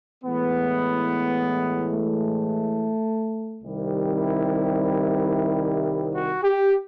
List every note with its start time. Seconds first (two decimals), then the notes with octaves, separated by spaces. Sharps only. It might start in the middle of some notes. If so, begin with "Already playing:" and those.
0.24 A2 E3 G#3 B3
1.93 A3
3.61 C2 C3 D#3 G3
4.04 E4
6.15 F#4
6.43 G4